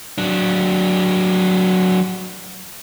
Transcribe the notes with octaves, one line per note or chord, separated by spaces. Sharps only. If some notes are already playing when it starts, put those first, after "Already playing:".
F#3 D4